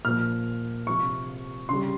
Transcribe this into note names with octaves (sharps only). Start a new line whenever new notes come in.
A#2 F3 F6
C3 F3 C#6
C#3 G3 C6